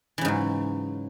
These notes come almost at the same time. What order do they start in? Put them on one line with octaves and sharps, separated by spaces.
E3 C#3 G#2 F#3